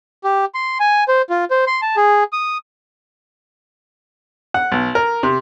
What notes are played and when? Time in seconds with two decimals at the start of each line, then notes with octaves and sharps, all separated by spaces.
0.24 G4
0.55 C6
0.80 G#5
1.08 C5
1.30 F4
1.50 C5
1.67 C6
1.82 A5
1.97 G#4
2.33 D#6
4.54 F#5
4.72 B1
4.95 A#4
5.23 C3